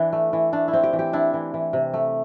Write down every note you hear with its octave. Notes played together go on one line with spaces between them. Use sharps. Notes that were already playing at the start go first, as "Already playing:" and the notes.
Already playing: E3 D4 E4
A3
E3
A3 D4
E4
C4
G4
E3
G4
D4 E4
E3
E3
C3
A3